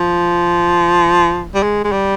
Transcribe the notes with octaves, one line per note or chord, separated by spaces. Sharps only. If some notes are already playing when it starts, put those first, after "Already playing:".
Already playing: F3
G3
G#3
G#3
G3